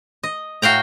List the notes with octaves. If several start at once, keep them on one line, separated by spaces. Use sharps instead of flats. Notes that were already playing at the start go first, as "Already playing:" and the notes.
D#5
A2 F#4 F5 G5 A#5